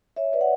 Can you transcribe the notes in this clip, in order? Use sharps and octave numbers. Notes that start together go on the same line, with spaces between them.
C#5 E5
B4 D5
F#5